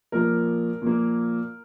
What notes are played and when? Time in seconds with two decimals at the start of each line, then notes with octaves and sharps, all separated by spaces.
0.12 A#2 F3 A#3 A#4
0.82 A#2 F3 A#3